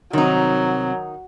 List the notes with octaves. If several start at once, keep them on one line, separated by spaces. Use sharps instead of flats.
C2 D#3 F#3 C4 D#4